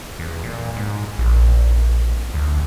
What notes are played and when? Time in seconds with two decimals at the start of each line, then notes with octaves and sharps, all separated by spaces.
0.19 E2
0.44 A#2
0.77 G#2
1.18 A#1
2.34 D2